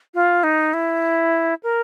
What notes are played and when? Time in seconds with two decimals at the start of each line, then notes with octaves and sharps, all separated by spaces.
0.14 F4
0.43 D#4
0.73 E4
1.63 A#4